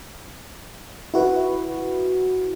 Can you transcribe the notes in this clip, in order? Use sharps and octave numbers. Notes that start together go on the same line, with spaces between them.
E4 F#4 B4